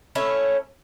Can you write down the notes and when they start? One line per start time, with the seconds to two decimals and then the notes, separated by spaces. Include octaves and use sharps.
0.15 A3 C#4 E4 C#5